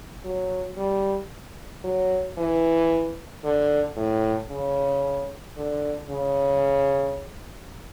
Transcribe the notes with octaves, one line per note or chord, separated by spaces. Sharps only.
F#3
G3
F#3
E3
D3
A2
C#3
D3
C#3